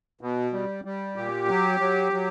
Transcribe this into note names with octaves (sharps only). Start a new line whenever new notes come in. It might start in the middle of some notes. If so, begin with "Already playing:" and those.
B2
G3
G3
A#2 G4
F#3
F#3
F#3